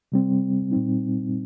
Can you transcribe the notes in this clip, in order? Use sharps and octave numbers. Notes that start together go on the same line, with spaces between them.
C3 G3 C4
A#2 G3 C4 D#4